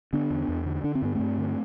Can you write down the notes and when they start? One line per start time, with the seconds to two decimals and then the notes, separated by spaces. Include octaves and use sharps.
0.13 D3 B3 D4
0.30 E2
0.48 E2
0.66 D3
0.84 D3 D4
0.95 C4
1.02 G2 B3
1.15 G2 A3 C4
1.38 D3